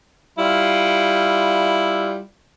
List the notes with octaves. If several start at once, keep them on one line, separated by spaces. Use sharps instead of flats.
G3 E4 F4